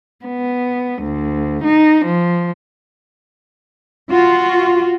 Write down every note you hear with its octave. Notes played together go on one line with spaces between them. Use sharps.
B3
D2
D#4
F3
F4 F#4